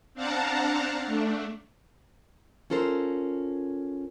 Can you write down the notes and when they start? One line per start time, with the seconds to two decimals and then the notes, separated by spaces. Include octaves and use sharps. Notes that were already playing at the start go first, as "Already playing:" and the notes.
0.14 C4 D4 F5 F#5 A5 A#5
1.06 A3 D4
2.70 C#4 F4 A4 A#4 C5